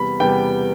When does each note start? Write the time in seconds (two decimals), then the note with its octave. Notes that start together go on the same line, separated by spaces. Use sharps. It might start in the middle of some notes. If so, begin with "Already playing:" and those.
Already playing: E2 C3 G3 B3 B5
0.20 E2 C3 G3 B3 G5